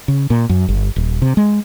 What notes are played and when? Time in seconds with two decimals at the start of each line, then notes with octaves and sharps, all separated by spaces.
0.08 C#3
0.30 A#2
0.49 F#2
0.68 G1
0.96 D#1
1.22 C3
1.37 G#3